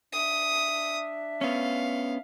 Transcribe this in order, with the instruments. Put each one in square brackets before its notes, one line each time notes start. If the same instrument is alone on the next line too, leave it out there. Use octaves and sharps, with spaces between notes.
[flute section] D4 E5 [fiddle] D#6
[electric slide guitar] B3 C#4 [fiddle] F5